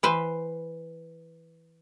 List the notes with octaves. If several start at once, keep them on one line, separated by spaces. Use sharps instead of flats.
E3 B4 C5